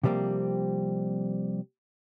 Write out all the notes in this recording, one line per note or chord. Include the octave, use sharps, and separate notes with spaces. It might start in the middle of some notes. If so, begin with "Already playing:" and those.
C3 F3 G3 A#3 C4